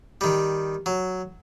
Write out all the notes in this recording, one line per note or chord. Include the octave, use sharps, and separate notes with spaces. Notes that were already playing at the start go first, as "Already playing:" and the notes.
D#3 G3
F#3